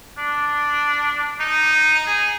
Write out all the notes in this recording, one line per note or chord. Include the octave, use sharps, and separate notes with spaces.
D4
D#4
G#4